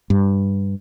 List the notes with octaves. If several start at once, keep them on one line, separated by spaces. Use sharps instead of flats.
G2